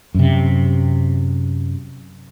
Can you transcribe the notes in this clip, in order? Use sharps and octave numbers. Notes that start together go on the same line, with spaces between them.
F#2 C3